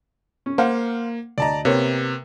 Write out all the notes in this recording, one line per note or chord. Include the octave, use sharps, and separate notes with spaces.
C#4
A#3 C5 F5 F#5
D2 D5 D#5 A5 A#5
C3 A#3 B3 C#5